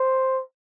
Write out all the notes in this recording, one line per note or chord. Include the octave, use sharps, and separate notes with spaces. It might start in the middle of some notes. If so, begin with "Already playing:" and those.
Already playing: C5